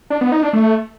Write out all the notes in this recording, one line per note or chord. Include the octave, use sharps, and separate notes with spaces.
D4
B3
D#4
D4
A3